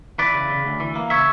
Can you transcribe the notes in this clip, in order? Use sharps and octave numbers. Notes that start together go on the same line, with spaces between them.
E3 B4 D5
C#3
C#3
D2
E3
A#3
C#3 C#5 E5